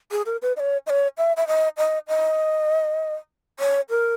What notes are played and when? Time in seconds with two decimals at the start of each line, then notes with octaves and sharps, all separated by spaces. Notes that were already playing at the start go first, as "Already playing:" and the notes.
0.11 G#4
0.26 A#4
0.42 B4
0.57 D#5
0.60 C#5
0.87 D#5
0.90 C#5
1.18 E5
1.37 E5
1.47 D#5
1.78 D#5
2.08 D#5
3.60 C#5
3.90 A#4